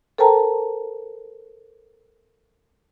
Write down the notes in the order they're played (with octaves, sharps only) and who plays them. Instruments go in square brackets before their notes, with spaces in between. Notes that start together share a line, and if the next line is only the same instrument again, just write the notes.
[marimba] A4 A#4 C5 G5 A5 A#5